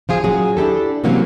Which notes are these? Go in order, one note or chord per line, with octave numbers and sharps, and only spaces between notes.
F3 F4 G#4
A#2 F#3 C#4 G#4
D4 E4 G4 A4
C3 E3 F#3 A#3 C4 C#4